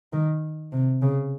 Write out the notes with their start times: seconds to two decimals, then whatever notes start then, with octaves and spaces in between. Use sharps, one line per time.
0.13 D#3
0.73 C3
1.02 C#3